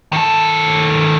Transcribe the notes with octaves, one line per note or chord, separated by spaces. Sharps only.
D#3 A4